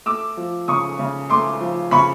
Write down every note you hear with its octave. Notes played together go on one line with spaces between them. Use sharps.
A3 D6 E6
F3
C#3 C#6 D#6
C#3
A3 C6 D6
F3
C#3 B5 C#6